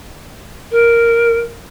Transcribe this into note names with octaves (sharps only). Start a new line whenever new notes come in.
A#4